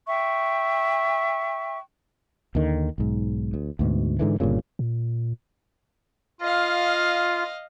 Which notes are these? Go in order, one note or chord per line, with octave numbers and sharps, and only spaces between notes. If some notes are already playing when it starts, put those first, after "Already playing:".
E5 G5 C#6
D#2 D3 D#3
B1 G#2
D2
D2 G#2 B2
G#2 D3 E3
G1 G2 A#2 C#3
A#2
F4 D#5 F5